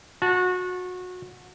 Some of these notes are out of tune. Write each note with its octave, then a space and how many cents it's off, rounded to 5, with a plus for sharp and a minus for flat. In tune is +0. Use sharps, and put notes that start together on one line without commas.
F#4 -25 A5 +0